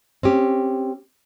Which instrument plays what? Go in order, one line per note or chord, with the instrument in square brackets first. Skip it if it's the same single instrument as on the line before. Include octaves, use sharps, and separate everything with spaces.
[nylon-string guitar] C4 C#4 G4